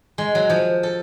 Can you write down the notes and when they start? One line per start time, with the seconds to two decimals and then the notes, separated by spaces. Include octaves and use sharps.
0.18 G#3
0.35 F#3
0.50 F3
0.83 A4